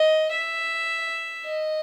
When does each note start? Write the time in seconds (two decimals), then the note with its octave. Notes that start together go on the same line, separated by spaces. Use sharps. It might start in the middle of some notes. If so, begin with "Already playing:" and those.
Already playing: D#5
0.31 E5
1.45 D#5